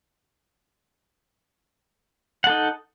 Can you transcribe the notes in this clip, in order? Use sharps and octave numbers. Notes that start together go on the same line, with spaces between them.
D#4 A4 F#5